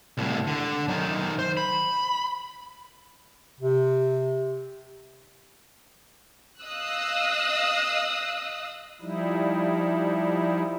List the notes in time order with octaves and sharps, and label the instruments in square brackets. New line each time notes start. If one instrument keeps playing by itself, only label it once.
[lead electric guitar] C2 A2
D3
F#2 D#3
C5
B5
[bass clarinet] C3
[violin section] D#5 F5 D#6 E6 F#6
[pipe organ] F3 G3 D#4 E4